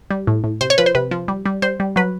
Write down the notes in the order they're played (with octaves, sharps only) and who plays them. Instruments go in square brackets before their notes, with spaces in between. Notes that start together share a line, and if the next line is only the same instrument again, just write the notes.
[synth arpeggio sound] G3
A2
A2
C3 C5
C#5
F3 B4
C5
C3 B4
F3
G3
G3
G3 C5
G3
F#3 B4